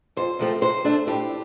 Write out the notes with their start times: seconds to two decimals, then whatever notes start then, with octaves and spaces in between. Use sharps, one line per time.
0.17 F2 C5
0.39 C3 F3 A3 C4
0.61 C3 C5
0.85 A3 D4
1.07 A2 G4